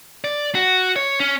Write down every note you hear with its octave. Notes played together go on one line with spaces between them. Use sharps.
D5
F#4
C#5
C#4